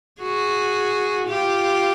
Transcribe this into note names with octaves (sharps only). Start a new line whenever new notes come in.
F#4 G#4
F4 G4